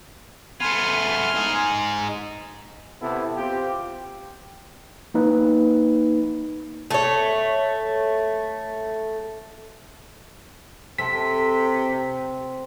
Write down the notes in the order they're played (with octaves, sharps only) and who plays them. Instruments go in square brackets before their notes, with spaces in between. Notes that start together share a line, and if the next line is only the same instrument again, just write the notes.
[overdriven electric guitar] A3 B3 [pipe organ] G#5 C6 F6
[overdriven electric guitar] D#4 G#4
[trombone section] C3 B3 E4 A4
C4 F4 G4
[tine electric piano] A#3 D#4 B4
[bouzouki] A3 C#5
[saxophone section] C3 [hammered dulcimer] C4 [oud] A4 [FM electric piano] B6